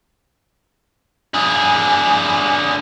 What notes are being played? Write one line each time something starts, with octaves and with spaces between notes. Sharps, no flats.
D3 G#4